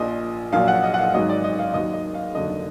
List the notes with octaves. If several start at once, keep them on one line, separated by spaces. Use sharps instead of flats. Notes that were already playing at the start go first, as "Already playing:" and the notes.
Already playing: A#1 A#2 F3 D#5
A#1 A#2 F#3 F5
F#5
D#5
F#5
F5
G#1 G#2 F#3 D#5
D5
D#5
F5
D#2 D#3 F#3 D#5
D#5
F5
F1 D#2 D3 F#3 D#5